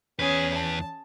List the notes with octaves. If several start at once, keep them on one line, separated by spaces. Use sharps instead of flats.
E2 C#4 G#4 B4
A5